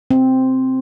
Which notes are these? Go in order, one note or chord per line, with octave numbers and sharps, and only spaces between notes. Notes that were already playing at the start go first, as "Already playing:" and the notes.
C4